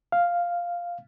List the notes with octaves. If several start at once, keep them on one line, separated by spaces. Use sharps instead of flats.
F5